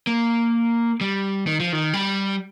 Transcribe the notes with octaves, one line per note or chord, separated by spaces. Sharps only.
A#3
G3
D#3
F3
D#3
G3